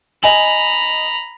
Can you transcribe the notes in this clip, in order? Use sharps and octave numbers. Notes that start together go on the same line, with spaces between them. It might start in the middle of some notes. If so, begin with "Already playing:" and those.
D#5 G#5 A#5 B5 F#7